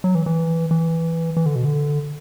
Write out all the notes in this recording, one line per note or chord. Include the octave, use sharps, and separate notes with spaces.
F#3
E3
E3
E3
E3
D3
B2
D3